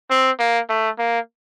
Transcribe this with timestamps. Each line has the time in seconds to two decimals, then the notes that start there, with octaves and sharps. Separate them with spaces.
0.10 C4
0.39 A#3
0.69 A3
0.98 A#3